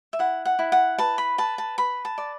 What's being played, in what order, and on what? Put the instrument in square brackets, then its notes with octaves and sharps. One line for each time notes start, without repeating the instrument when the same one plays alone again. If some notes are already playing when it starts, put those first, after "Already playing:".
[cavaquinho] E5
E4 F#5
F#5
E4
F#5
B4 A5
B5
B4 A5
A5
B4 B5
A5
D5